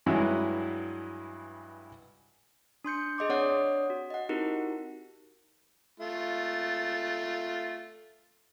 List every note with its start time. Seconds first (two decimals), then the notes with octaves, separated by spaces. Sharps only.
0.06 G2 E3 F#3 G#3 E4
2.84 D4 C6 G6 C#7
3.18 G#4 D#5 C6 D6
3.29 C4 D4 C#5 D5 F#5 D#6
3.90 F#4
4.10 D#5 F#5
4.29 C4 D#4 E4 F#4 G4 A#4
6.00 A3 F4